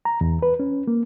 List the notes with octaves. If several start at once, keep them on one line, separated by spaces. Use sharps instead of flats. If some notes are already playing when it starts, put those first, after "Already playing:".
A#5
E2
B4
C#4
A#3